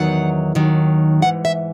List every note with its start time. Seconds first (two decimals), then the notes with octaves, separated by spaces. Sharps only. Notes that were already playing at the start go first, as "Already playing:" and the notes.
Already playing: E2 D#3 F#3 F#5
0.55 D#2 D#3 F#3
1.22 G#2 E3 F#5
1.45 E5